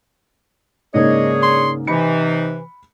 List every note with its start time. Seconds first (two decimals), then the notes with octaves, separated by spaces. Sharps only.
0.94 G#2 C#3 A#3 D4 G#4 C#5 D#5
1.42 C6
1.87 C3 E3 D#4 B5 C#7